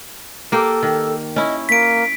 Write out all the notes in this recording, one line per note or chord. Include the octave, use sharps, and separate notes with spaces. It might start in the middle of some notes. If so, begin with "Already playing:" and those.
A#3 G4 A4
D#3
C#4 E4 D#5
A#3 B6 D7